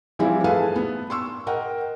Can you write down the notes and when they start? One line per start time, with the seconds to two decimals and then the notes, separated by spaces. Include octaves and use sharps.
0.19 E3 F3 G3 C4 E4
0.44 G#4 A4 B4 F5 G#5 A5
0.76 B3
1.10 C6 C#6 E6
1.47 A#4 D#5 F#5 G5